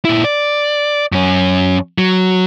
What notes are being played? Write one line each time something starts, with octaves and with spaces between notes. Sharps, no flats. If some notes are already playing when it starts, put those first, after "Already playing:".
A#2 E4
D5
F#2 C#4
F#3